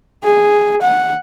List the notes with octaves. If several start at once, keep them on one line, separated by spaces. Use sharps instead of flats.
G#4
F#5